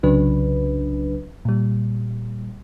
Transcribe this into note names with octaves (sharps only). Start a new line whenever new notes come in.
C2 C#3 F#3 D4 B4
A#2 G3